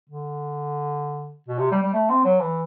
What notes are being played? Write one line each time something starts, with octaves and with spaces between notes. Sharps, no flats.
D3
B2
C3
G3
G3
A3
C4
F#3
E3